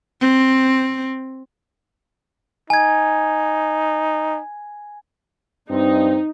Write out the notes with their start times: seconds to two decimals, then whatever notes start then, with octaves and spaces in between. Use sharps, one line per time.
0.21 C4
2.70 D#4 G#5 G#6
5.70 G2 C4 D#4